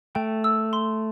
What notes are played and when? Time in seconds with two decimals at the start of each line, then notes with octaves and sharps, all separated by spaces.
0.15 A3 G5
0.44 E6
0.73 C6